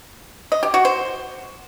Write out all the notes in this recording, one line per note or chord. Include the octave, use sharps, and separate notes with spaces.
D#5
G4
F#4
C5